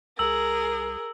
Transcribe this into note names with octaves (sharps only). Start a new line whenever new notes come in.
C2 G#4 A#4 E6 F#7